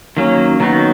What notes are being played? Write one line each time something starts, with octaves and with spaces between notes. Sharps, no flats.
D#3 F#3 A#3 C#4
D#3 F#3 B3 D#4